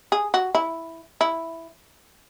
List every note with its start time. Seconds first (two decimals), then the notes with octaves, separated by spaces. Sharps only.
0.12 G#4
0.34 F#4
0.55 E4
1.21 E4